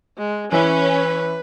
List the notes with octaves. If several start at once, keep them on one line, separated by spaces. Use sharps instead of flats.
G#3
E3 C#4 E4 B4